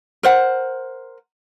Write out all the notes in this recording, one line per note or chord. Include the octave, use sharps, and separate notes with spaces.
A#4 C5 F#5